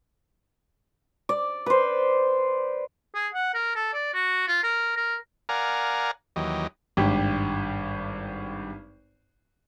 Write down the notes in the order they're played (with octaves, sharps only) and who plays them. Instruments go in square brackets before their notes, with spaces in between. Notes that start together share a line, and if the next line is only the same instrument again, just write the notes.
[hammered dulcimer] D5
B4 C5
[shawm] G#4
F#5
A#4
A4
D5
F#4
F4
A#4
A#4
[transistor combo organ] A#4 D5 F5 F#5 G#5 A#5
D#2 E3 F#3 G4 D#5
[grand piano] G#1 G2 G4 D6